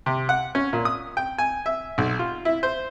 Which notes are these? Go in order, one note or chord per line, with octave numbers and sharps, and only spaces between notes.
C3
F#5
C#4
A#2
D#6
G5
G#5
E5
B1
F4
E4
C5